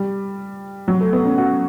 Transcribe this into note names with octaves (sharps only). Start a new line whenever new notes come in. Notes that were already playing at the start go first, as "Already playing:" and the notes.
Already playing: G3
F#3
A3
B3
C#4
F#4